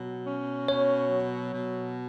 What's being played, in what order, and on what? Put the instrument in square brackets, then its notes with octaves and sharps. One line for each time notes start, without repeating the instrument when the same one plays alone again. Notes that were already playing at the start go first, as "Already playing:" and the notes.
Already playing: [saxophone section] B2 F#3
C#4
[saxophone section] B2 [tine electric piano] C#5
[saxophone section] F#3
B2